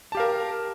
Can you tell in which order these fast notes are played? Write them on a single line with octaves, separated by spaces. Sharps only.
A5 G4 F5 A#4